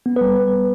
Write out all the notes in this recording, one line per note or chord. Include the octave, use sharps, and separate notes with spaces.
B3
B4
G3